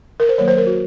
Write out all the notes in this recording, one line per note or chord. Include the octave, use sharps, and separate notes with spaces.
A#4
C5
D#3 F#3 A#3 C#5
C5
A#4
F#4